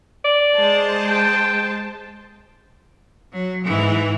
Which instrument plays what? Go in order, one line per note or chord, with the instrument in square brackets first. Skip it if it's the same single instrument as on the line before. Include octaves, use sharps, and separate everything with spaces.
[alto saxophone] D5
[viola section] G#3 C5 A5
[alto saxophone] G5
[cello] F#3
G#2 E3